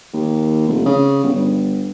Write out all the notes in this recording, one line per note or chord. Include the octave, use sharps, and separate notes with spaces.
D#2
F1
C#3
G1